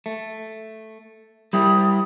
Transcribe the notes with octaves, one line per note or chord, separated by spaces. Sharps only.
A3
G3 E4 G4 D#6